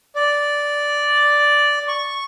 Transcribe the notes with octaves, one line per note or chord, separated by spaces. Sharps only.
D5
C#6